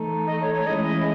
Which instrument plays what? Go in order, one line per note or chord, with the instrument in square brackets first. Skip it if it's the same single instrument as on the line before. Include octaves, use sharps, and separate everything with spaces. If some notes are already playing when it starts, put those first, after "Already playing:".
Already playing: [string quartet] E3 A3 D#4 A4
[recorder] D#5
C#5
C#5
[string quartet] E3 G#3 C#4 E4 [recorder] D#5